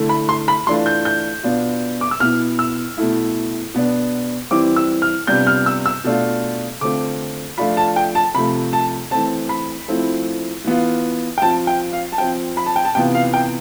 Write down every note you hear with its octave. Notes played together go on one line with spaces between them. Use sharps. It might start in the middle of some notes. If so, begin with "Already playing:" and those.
Already playing: D3 A3 E4
B5
C6
B5
E3 A3 D4 F4 C6
G6
G6
B2 B3 D4 F4
D6
E6
B2 B3 E4 F6
E6
B2 A3 E4
B2 B3 D4
E3 G3 C4 E4 D6
E6
F6
C3 G3 B3 D4 F4 G6
F6
E6
E6
B2 A3 D4 F4
D3 A3 C4 F4 D6
F3 A3 D4 F4 B5
A5
G5
A5
C3 F3 A3 B5
A5
E3 A3 C4 A5
B5
F3 A3 C4 E4
E3 B3 F4
G5
F3 C4 F4 A5
G5
F5
A5
F3 C4 F4 G5
B5
A5
G5
A5
C3 E3 B3 F4 G5
F5
G5